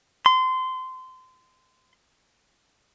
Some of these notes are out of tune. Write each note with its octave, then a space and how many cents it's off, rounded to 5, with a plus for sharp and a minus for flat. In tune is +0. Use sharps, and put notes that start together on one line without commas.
C6 -25